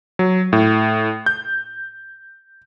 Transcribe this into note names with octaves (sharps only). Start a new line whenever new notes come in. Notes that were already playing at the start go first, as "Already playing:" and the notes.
F#3
A2
G6